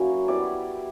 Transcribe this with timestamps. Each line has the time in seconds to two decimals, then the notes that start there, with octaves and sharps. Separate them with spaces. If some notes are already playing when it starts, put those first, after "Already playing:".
Already playing: F#3 A#3 C#4 E4 C#5
0.28 G3 B3 E4 D5